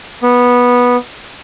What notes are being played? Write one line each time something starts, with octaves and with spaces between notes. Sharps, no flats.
B3